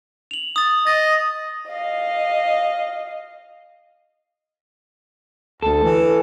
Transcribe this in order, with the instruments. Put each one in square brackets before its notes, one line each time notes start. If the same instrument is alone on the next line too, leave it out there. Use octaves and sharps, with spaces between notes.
[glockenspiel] F7 F#7
D#6 A6
[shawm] D#5 [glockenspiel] A6
[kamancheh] D#5 F5
[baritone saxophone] D2 [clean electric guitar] A4
[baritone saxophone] E3